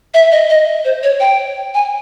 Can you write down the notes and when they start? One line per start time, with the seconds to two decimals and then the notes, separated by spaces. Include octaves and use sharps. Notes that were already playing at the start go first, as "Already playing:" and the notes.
0.14 E5
0.32 D#5
0.50 D#5
0.85 C5
1.03 C#5
1.20 G5
1.74 G#5